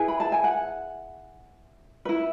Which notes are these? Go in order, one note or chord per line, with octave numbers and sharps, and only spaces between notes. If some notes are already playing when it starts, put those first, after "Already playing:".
Already playing: E4 G#4 B4 G#5
B5
A5
G#5
F#5
E4 B4